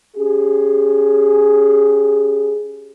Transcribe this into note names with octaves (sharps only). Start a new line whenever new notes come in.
C#4 G4 G#4